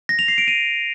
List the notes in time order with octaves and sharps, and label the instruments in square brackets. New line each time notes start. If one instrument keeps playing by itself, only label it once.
[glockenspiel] A#6
F7
C7
D7
D#7